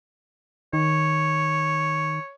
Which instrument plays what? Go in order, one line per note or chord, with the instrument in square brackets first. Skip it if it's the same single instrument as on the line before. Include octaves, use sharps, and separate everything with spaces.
[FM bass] D#3 [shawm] C#5